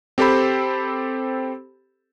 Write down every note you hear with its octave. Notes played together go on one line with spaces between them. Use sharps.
C4 G4 A4 C5 B5